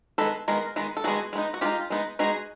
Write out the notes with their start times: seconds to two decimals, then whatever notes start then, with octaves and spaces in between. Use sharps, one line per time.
0.18 D#3 G#3 B3 A4 B4
0.48 D#3 G#3 B3 A#4
0.76 D#3 G#3 B3
0.97 A4
1.04 D#3 G#3 B3 F#4 G#4
1.33 G#3 B3 D#4
1.54 F#4
1.61 G#3 B3 F4 G4
1.66 D#4
1.90 G#3 B3 D#4
2.19 G#3 B3 D#4 F#4 G#4